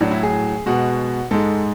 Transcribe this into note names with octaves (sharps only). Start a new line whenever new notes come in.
A2 F#3 D4
E4
G#4
B2 G#3 F#4
G#2 G#3 A4